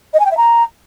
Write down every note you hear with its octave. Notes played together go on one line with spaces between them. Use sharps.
D#5
G#5
G5
E5
A#5